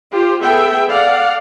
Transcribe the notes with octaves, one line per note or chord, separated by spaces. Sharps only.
F4 G4 C5
B3 G#4 A4 E5 G5
A4 D5 F5 F#5